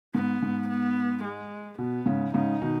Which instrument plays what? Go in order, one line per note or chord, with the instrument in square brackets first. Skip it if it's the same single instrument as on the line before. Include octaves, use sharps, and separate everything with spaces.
[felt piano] G#2 [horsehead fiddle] B3
[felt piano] G#2
[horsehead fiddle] B3
G#3
[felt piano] B2 [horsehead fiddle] B3
[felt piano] G#2 C#3
[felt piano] G#2 C#3 [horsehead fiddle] D#4
[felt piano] B2 D#3